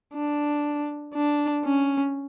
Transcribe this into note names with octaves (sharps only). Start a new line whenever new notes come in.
D4
D4
C#4